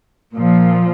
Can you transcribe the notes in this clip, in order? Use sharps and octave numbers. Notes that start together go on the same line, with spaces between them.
A#2 F3